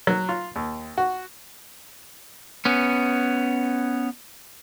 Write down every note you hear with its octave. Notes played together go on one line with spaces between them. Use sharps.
F#3
F4
D#2
F#4
B3 C#4